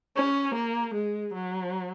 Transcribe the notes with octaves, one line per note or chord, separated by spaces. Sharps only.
C#4
A#3
G#3
F#3